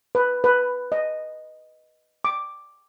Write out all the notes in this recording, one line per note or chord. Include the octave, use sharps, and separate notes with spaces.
B4
B4
D#5
D6